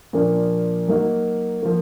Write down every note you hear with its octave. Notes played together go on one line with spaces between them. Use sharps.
A#2 F3 A#3 D4
F#3 A#3 D#4 F#4
F3 A#3